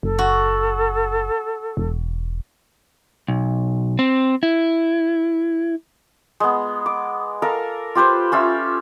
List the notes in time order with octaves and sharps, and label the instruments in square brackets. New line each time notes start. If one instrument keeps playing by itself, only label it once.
[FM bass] F#1 [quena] A4
[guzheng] F#4
[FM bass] E1
[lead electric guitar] B1
C4
E4
[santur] G#3 B3
D6
A4 A#4 F5
F4 G4 B4 C5
C#4 F4 E5